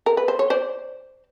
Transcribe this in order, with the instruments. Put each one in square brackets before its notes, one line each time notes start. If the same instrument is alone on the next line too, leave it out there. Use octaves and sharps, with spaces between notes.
[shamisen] A#4
B4
C5
C#5
C5 D5